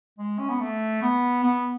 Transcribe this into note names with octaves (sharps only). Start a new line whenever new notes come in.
G#3
C#4
B3
A3
B3
B3